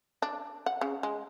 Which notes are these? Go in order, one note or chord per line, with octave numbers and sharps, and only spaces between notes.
D4
F#5
C#3
G#3